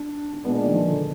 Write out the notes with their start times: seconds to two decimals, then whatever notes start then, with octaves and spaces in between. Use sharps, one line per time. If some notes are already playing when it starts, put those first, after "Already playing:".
Already playing: D4
0.33 D4
0.45 A#2 G#3 B3 D4
0.66 D#3
0.73 F3
0.88 D3